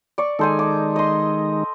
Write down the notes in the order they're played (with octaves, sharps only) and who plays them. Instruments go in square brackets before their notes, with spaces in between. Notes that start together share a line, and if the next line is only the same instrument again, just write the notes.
[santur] D5 C#6
[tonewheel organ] D#3 G#3 D#4 [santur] A4 C5 G#5
[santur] D6
D#5 C6